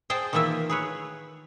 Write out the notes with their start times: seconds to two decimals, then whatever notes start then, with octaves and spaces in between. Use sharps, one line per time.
0.10 G#4 C5 G5 A5
0.33 D#3 E3 A#3 F4 E5
0.69 G#4 B4 C#5